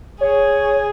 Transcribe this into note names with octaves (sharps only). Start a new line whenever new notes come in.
G#4 C#5